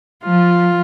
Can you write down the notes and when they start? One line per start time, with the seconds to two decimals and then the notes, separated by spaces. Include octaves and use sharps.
0.24 F3 F4